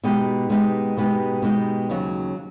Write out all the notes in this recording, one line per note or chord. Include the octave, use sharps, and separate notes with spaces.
B2 G#3 B3 D#4 G4
B2 G#3 B3 D#4 G4
B2 G#3 B3 D#4 G4
B2 G#3 B3 D#4 G4
D#2 C#3 F#3